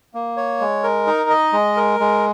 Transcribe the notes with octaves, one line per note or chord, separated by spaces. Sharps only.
A#3
C#5
G#3
A#4
D#4
D#5
G#3
A#4
G#3